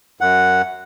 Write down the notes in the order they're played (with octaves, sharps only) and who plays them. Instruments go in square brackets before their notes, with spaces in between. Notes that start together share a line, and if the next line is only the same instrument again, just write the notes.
[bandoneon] F#2 F#5